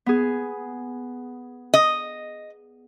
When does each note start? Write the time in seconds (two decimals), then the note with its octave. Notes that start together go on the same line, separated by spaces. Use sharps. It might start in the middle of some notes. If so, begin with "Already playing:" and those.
0.06 B3 G#4
1.74 D#5